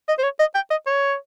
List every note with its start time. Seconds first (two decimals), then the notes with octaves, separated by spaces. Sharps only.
0.09 D#5
0.19 C5
0.24 C#5
0.40 D#5
0.55 G5
0.71 D#5
0.87 C#5